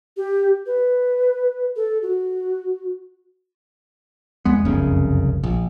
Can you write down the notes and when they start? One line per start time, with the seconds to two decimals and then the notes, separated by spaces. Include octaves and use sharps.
0.17 G4
0.66 B4
1.76 A4
2.02 F#4
4.45 E2 G#3 B3
4.65 F1 C2 F#2 C#3
5.43 A#1